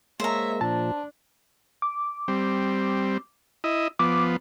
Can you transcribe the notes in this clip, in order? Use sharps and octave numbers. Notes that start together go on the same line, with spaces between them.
G#3 A#3 C5 C#5 E5 A#5
A#2 F3 D4 A5
D6
G3 C4
E4 D#5
F3 B3 D6